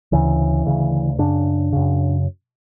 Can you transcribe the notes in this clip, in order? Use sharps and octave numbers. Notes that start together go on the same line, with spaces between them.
D2 C#3 E3
D2 C#3
F#2 C#3 D4
F#2 C#3